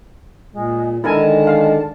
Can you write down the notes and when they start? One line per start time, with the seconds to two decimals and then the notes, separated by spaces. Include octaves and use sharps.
0.53 A#2 G#3
1.04 D3 D#3 G#3 E4 A#4 G#5 A5
1.47 F5